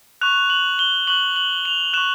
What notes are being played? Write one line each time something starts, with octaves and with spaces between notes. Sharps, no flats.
C#6 F#6 F7
F#7
G7
C#6 F#6 F#7
F#7
F7
C#6 F#6 E7